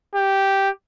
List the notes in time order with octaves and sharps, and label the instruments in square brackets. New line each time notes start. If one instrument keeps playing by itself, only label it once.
[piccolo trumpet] G4